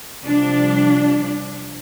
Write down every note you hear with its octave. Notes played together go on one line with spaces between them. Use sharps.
C3 F3 G3 D4